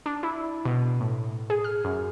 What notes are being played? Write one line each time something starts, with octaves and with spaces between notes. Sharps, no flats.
D4
E4
B2
A2
G#4
F6
F#2